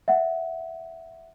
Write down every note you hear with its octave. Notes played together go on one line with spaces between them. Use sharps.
E5 F#5